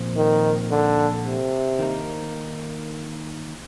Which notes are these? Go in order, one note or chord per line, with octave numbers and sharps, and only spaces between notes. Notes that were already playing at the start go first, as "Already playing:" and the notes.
Already playing: A#2 F3 C4
D#3
D3
C3
D#3 A#3 D#4